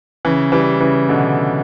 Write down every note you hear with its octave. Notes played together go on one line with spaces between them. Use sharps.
C#3 E3
E3 G3
C#3 E3
B2 D3